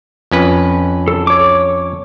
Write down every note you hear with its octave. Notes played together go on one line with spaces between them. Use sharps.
F2 C#4 B4
A4
C#5 D6